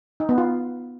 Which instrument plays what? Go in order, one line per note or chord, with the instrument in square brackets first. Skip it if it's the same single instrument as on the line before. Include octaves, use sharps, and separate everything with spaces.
[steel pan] D#4
B3
F4